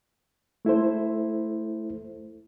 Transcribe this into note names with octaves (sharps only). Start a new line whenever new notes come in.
A3 E4 A4 C5